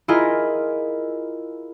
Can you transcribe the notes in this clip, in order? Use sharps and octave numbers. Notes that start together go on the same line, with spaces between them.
E4 F4 G#4 A#4 D#5